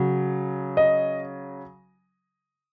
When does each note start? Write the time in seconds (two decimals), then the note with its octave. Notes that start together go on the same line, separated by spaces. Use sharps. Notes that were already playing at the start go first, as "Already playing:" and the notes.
Already playing: C#3 F#3
0.77 D#5